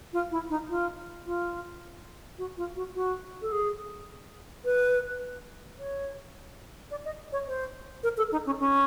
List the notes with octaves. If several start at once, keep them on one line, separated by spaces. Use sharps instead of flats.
F4
E4
D#4
F4
F4
F#4
F4
F#4
F#4
A4
G#4
B4
C#5
D5
D#5
C#5
C5
A#4
A4
D#4
C#4
C#4